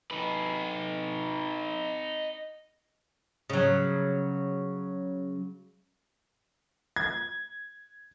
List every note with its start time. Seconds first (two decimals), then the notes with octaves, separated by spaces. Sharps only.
0.11 D#4 B4
3.50 C#3 F#3
6.96 G#6